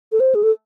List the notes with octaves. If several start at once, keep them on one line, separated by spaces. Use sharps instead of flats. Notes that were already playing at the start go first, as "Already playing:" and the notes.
A4
C5
G#4
A4